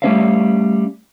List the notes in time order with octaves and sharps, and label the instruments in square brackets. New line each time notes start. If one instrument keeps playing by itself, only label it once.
[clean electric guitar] G3 A3 C#4 C#5 E5 F5